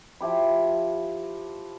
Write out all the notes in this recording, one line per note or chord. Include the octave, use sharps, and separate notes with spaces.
F3 E4 G4 B5